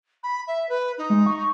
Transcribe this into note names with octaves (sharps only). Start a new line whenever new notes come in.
B5
E5
B4
D#4
G#3
C#6